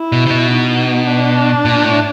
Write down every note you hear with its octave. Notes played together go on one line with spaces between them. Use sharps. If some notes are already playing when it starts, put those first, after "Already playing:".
Already playing: E4
B2
C3
B2
D#4
D4
A#2
A2